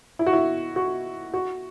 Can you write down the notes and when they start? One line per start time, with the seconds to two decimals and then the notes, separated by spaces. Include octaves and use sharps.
0.19 E4
0.27 F#4
0.33 E4
0.76 F#4
1.34 F#4